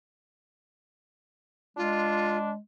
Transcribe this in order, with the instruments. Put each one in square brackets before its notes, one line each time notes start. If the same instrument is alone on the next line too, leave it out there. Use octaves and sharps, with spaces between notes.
[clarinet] G#3 [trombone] D4 [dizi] F4